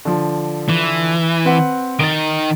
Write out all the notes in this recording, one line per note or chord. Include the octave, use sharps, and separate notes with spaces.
D3 F3
E3
C4 B4 F#5
D#3 A6 D7